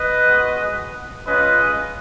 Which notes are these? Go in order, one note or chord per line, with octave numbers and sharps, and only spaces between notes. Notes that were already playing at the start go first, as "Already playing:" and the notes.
Already playing: B4 D#5
G#3 B3 F#4
G#3 C#4 F4 B4 D#5